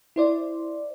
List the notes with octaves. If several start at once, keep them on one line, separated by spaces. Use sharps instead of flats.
E4 C5 D5